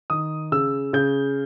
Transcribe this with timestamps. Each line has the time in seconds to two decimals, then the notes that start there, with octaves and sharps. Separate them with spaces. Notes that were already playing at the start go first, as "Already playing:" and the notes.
0.10 D#3 D#6
0.52 C#3 E6
0.93 C#3 G6